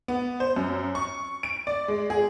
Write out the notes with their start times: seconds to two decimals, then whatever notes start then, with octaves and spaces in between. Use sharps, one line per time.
0.08 B3
0.40 C5
0.56 F#2
0.95 C#6
1.43 D7
1.67 D5
1.88 G#3
2.10 G#4